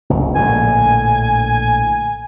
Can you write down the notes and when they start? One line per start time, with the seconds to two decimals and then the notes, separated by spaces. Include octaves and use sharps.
0.10 F1 C#2
0.35 A#1 A2 D3 G#5